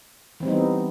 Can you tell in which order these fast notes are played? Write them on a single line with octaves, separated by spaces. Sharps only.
E3 C4 G3 D#4 B3